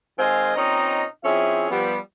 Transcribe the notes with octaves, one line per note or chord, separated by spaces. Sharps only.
D#3 G#3 C4 D#5 F5 G#5
A#2 C4 C#4 D#4 D#5 A#5
F3 C4 C#4 E4 G#4 E5
F3 G3 B3